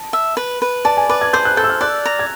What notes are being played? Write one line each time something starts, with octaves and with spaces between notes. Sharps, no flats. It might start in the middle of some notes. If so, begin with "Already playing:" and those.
Already playing: A5
E5
B4
B4
D5 A5
G#5
B4 D6
G#6
C5 G6
F#6
A4 G6
E6
F6
D5 F#6
A#5
G#6